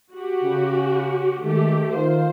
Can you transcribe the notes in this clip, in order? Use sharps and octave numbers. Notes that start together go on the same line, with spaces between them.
F#4 G4
C#3 C#4
D#3 G#3 A3 G4
D#3 F4 C5